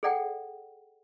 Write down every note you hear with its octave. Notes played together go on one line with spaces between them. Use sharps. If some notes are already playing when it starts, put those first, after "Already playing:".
G#4 A4 D5 F#5 G5